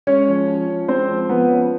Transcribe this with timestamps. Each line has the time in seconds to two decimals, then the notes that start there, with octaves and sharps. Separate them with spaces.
0.07 G#3 C#4 C#5
0.28 F3
0.47 F3
0.68 C#4
0.88 G#3 C4 C5
1.09 F3
1.29 F3 B3 B4
1.50 C#4